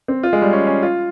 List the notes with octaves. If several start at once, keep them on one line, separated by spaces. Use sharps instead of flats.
C4
F4
G#3
G3
C#4
C#4
F4